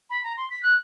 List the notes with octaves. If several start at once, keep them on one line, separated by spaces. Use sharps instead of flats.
B5
A#5
C6
B6
F#6